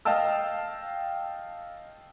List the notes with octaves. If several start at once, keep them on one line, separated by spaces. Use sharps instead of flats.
D#5 F5 G5 A5 E6